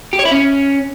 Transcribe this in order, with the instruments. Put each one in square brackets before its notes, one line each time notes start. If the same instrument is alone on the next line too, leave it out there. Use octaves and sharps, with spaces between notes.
[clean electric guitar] G4
C#5
E4
C#4